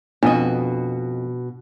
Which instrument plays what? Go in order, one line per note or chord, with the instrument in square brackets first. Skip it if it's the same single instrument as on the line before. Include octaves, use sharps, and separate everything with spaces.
[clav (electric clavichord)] F2 D#5 [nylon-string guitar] B2 F#4 [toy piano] D4